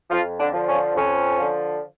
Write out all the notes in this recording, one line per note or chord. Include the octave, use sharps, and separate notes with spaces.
F2 F3 F4
D3 D4
D3 F3
C#4
F2 C#4
D3 F3